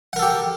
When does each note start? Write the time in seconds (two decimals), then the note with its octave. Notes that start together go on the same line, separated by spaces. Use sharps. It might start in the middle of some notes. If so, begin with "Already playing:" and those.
0.13 F#5
0.16 A#4
0.19 A4
0.22 G4